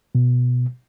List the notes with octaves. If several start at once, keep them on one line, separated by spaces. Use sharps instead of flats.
B2